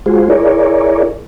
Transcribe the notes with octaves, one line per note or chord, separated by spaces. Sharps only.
G#3 F4 F#4 G#4 C5
E4 G#4 A#4 C#5 D5